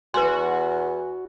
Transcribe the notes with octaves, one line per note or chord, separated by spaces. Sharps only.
E2 F#4 B4 G#5 C6